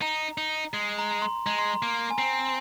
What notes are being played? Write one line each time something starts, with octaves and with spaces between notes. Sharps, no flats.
D#4 A#5
D#4
G#3
A#5
A#5
C6
G#3 A#5
C6
A#5
A#3
G#5
C4 A#5